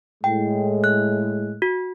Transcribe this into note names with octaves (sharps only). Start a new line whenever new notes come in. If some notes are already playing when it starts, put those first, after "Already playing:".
A2 G#3 G5
F#6
F#4